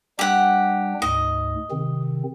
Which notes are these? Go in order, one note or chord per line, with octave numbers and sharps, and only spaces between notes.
G3 D4 G4 F#5
D2 G#2 D#5
C3 D#3 C4